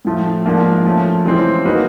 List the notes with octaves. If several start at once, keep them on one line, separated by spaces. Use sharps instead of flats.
A2 F3 A3
G#2 F3 A#3 D4
F3 A3 C#4
C#3 E3 G#3 C4
F#3 A#3 D#4 F#4 B4